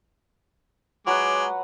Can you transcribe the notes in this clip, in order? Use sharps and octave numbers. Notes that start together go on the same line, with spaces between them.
F#3 G#3 B4 F#5 D6